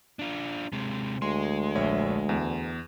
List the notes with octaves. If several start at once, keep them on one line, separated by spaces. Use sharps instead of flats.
D4 F4
C3 G#3
D2 G#3 C6
A#1 C#5 E5
E2